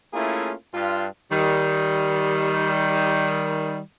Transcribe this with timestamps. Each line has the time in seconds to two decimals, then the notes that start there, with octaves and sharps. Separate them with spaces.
0.14 A3 A#3 C#4 E4 F4 G#4
0.73 G2 F4
1.31 D#3 G3